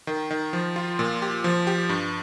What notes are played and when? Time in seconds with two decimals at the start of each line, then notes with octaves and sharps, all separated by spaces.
0.07 D#3
0.31 D#3
0.53 F3
0.76 F4
0.99 A#2
1.22 G4
1.44 F3
1.67 G4
1.89 G2